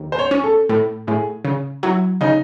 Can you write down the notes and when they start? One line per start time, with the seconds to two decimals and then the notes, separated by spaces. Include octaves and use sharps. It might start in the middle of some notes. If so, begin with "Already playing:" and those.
Already playing: D#2
0.12 C5
0.19 C#5
0.31 C#4
0.44 A4
0.69 A2
1.07 A2 G#4
1.45 C#3
1.83 F#3 E4
2.21 C#3 D#4